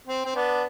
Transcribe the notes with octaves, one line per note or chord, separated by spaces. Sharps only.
C4
C4
B3 D4